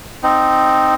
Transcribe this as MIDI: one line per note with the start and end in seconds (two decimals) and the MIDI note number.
0.23 0.95 60
0.23 0.95 63